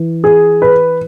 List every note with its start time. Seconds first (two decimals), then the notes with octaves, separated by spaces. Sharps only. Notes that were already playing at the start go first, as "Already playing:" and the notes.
Already playing: E3
0.24 G#4
0.62 B4